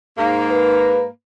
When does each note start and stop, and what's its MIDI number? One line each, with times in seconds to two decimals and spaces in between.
0.18 1.07 44
0.18 1.07 58
0.51 1.05 71